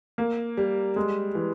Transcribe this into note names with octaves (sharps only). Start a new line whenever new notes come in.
A#3
G3
G#3
E3